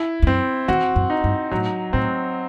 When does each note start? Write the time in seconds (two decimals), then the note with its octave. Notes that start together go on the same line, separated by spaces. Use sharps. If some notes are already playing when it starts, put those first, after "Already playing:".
Already playing: E4
0.22 E2
0.27 F#2 C4
0.68 E2 F#4
0.96 F#2
1.10 D#4
1.24 G2
1.51 A2 F#3
1.93 A2 C4